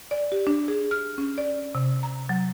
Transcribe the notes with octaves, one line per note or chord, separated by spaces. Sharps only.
D5
G4
D4
G#4
F6
C#4
D5
C3
A#5
F#3